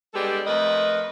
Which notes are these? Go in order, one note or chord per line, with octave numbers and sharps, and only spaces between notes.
G3 G#3 B3 D4 G4 A4
F2 A3 A#4 B4 D#5